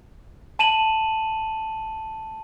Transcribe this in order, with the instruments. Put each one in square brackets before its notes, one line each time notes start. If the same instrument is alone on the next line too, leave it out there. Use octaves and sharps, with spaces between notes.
[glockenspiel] A5 D#7 E7 F#7